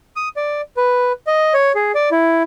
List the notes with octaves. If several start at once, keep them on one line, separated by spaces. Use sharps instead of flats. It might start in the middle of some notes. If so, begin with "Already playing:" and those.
D#6
D5
B4
D#5
C#5
G#4
D5
E4